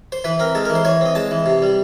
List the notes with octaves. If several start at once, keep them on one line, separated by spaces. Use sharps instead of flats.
C5
E3 B4
C4 A#4
G#3 A4
E3 A#4
C5
E3 C#5
C4 D#5
G#3 A5
E3
C3
G3